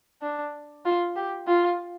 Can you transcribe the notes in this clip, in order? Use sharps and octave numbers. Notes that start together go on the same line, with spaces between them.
D4
F4
G4
F4